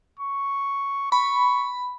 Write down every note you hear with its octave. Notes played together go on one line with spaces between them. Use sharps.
C#6
B5 C#6